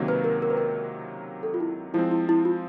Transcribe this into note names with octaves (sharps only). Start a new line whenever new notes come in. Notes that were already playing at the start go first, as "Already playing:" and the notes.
Already playing: C#2 C3 D#3 F#3 A#3
B4
A#4
A#4
B4
A#4
A4
F4
E4
F3 G#3 C4 E4
E4
E4
F4